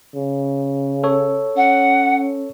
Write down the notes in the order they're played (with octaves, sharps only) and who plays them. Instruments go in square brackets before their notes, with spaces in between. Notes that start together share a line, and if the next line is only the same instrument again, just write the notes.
[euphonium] C#3
[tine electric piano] A4 C#5
[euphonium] C#4 [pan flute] F#5